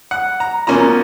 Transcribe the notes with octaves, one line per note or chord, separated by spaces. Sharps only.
F#5
A#5
B2 A#3 C#4 F4 A#5